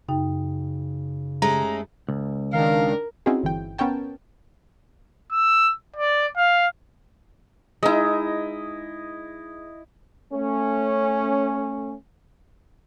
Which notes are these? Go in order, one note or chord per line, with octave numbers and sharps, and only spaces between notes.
F#2 C#3 D#4 G5
G#3 A3 C#4 G4 A#5
C#2
D#3 D4 A#4 F5
C4 C#4 D#4 E4 F#4 G#4
G1 E3 G5
B3 C#4 A#4 C#5 G5 A5
E6
D5
F5
G#3 D#4 E4 D#5
A3 C#4